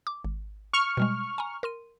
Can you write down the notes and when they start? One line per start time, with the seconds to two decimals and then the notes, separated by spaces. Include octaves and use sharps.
0.07 D6
0.25 G#1
0.73 C#6 F6
0.97 B2 G3 G#3
1.38 G#5 A#5
1.63 A#4 C6 D#7